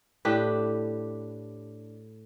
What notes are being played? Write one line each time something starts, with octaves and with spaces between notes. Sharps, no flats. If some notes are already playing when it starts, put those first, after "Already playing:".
A2 D4 G4 B4